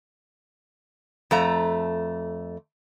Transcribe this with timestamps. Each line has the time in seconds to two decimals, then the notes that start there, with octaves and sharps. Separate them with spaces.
1.31 F2 A3 A#5